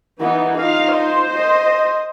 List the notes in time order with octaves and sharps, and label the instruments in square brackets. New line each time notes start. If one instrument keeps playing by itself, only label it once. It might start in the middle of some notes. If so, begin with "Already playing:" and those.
[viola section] E3 D#4 [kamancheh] B3
[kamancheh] D#4 F4 [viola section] F5
[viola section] C5
[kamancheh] D#5